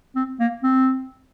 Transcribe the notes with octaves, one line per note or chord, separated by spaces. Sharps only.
C4
A#3
C4